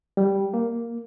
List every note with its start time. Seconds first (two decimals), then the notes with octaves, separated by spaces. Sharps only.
0.17 G3
0.54 A#3